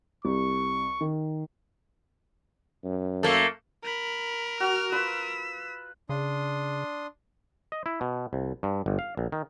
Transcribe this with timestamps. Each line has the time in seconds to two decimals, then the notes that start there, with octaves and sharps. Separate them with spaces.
0.25 C2 C#6
1.01 D#3
2.84 F#2
3.23 A3 A#3
3.84 A#4 B5
4.60 F#4 F6
4.92 F4 B4 B5 E6 B6
6.09 C#3 D4 C6 D#6
7.72 D#5
7.86 E4
8.01 B2
8.33 C2
8.63 G2
8.86 G1
8.99 F5
9.17 A#1
9.32 D#3